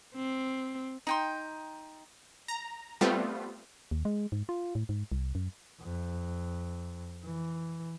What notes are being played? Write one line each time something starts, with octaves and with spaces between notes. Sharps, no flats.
C4
D#4 G5 C6
A#5
G3 A3 B3 C4 F4
D#2
G#3
G#2
F4
A2
G#2
C2
F#2
F2
E3